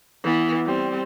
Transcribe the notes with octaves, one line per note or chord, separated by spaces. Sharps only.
E3 B3
G3 C4